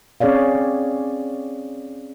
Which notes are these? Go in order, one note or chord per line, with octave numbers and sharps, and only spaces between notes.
C4 C#4 G#4 C#5 D5 F5